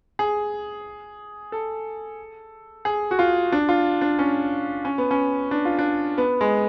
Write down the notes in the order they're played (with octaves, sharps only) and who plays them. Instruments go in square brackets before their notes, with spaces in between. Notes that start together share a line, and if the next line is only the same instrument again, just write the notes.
[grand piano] G#4
A4
G#4
F#4
F4
D4
F4
D4
C#4
C#4
B3
C#4
D4
F4
D4
B3
G#3